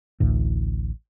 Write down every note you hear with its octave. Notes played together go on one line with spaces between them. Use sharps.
A1 D2 A2